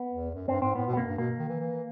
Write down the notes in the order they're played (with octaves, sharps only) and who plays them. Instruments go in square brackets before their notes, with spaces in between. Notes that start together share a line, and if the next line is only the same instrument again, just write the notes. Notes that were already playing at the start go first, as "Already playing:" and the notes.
Already playing: [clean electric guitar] B3
[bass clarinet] E2
F#2
[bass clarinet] G2 [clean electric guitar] C4
[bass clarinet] G#2 [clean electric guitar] C4
[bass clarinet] A2 [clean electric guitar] B3
[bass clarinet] B2
[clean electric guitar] B3
[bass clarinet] F#2 [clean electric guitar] A#3
[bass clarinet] G2
[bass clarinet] B2 [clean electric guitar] A#3
[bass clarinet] D#3
E3
E3